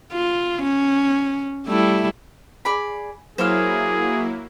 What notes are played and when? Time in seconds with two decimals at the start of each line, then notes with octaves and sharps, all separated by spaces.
0.12 F4
0.62 C#4
1.68 G3 A3 E4
2.65 G#4 D5 B5
3.38 F#3 A#3 E4 G#4 C5 C#5 F5